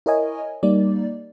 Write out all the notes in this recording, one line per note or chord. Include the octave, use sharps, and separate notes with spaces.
E4 A#4 C#5 D#5 G#5
G3 A#3 D#4 D5